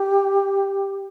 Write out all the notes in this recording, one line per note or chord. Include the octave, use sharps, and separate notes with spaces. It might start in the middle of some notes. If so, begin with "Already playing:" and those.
Already playing: G4